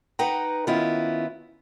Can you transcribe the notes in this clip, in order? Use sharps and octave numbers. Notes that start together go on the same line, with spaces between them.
D#4 B4 F#5 G5 A#5
D#3 B3 C#4 E4 F4